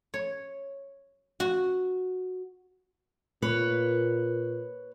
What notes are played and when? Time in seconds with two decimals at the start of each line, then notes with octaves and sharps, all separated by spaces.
0.14 C#5
1.40 F#4
3.42 A#2 B4 C#5